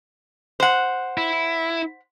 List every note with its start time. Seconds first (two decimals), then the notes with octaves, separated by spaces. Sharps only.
0.60 C5 F#5
1.18 E4